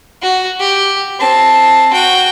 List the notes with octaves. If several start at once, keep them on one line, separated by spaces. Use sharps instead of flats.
F#4
G4
C4 A5
F#4 G5